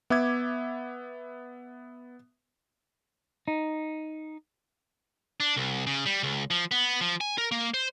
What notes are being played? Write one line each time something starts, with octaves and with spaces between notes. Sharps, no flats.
B3 E5 D6 G#6
D#4
D4
C2
C#3
G3
C#2
F3
B3
F3
G#5
A#4
A#3
C5